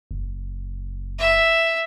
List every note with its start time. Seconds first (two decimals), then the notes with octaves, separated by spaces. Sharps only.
0.11 F#1
1.18 E5